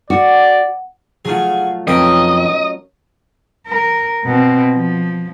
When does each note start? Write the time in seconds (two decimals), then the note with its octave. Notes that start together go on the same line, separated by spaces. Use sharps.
0.10 F#4 D5
1.25 F#3 A3 F4 F#4 G#4
1.87 B1 F2 C#4 A#4 B4 D#5 G5
3.68 A#4
4.24 B2 C4
4.72 F3